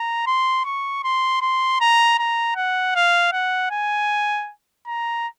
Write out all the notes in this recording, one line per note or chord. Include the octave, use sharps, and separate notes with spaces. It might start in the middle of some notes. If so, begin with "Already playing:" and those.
Already playing: A#5
C6
C#6
C6
C6
A#5
A#5
F#5
F5
F#5
G#5
A#5